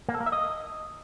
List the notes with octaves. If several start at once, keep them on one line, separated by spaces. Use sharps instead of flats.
A#3
A4
A#3
E5
D#5